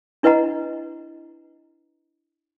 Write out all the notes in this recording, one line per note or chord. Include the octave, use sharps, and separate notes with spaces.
D4 E4 B4 D#5 F#5 A#5